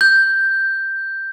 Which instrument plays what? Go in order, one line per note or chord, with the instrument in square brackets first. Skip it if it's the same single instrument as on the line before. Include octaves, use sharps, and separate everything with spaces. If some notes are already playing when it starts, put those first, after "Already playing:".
[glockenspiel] G6